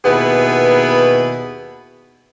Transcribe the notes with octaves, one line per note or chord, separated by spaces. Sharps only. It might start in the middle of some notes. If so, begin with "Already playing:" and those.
D#2 B2 B3 E4 G#4 B4